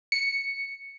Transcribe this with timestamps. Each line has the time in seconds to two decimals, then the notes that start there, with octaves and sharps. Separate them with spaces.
0.12 C#7